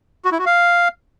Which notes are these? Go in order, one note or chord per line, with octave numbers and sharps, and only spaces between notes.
F#4
E4
F#4
F5